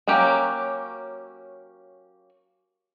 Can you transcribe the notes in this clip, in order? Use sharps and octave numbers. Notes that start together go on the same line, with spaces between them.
F#3 A#3 C#4 G4